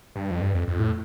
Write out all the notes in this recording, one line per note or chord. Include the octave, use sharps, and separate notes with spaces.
G2
F2
G2
F2
F2
A2